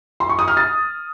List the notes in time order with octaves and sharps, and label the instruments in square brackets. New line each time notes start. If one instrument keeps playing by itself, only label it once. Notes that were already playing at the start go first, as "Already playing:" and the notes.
[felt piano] C6
C#6
D#6
F6
A6